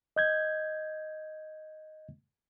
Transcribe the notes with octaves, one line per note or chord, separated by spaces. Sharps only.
D#5 G6 G#6